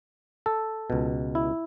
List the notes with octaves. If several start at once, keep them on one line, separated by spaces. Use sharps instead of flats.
A4
C#2 B2
E4